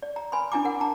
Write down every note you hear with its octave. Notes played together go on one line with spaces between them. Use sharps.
D5
A#5
B4 G#5 B5 C6
D4 E4 G#5 A#5 D6
A#4 F#5
A5 A#5